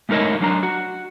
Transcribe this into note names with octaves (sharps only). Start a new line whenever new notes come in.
G#3 A3 D#4 A#4 C#5 D#5
F#3 D4 A#5
F#4